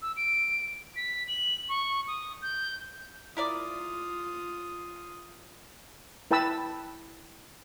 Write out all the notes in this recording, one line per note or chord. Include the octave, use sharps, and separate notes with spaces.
E6
D7
B6
F#7
C#6
D#6
G6
E4 F4 A#4 D5 D#6
E4 B4 G5 A5 B5 E6